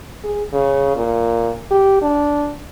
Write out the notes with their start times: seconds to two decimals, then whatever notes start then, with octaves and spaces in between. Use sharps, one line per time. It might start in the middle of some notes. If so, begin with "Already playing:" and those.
0.24 G#4
0.54 C#3
0.96 A#2
1.71 G4
2.02 D4